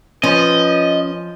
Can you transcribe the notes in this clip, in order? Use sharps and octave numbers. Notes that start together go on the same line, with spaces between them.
F3 C#4 B4 D#5